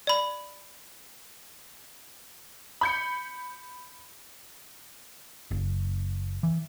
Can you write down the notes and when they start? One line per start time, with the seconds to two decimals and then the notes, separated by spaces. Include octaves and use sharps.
0.07 D5 B5
2.81 B5 G6 C#7
5.51 F#1
6.43 E3